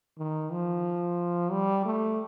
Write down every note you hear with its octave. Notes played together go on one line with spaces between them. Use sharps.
D#3
F3
G3
A3